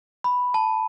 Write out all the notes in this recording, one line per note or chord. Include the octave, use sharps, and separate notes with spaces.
B5
A5